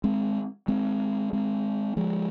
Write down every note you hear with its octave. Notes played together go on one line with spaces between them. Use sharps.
G#3 C4
G#3 C4
G#3 C4
F3 G#3